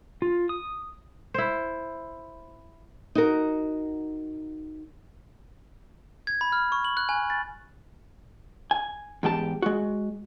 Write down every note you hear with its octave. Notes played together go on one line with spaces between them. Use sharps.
F4
D#6
E4 C5
D#4 F#4 A#4
G#6
B5
F6
C#6
F#7
F#6
G#5
A6
G#5
E2 G#2 G4 A5
G#3 F#4